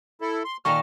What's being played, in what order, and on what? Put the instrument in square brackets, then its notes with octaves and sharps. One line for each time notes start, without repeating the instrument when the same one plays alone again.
[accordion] E4 A4
C6
[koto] A#2 D#3 A4 [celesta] C#6 [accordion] F6